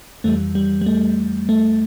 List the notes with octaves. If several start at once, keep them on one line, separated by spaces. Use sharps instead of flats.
F2 E3 G3 A3
G3
G3
A3
A3